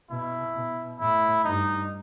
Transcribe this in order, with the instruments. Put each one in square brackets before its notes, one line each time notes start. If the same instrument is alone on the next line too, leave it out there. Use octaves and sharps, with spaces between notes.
[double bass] B2 [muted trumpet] E4
[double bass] B2
[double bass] A2 [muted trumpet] E4
[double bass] G2 [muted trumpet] D#4